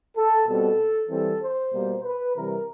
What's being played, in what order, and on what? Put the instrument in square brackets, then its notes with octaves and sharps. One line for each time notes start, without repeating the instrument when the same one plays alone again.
[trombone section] A4
B2 G3 C4 A4
E3 G3 C4 A4
C5
B2 G3 A#3
B4
C3 E3 G3 A#4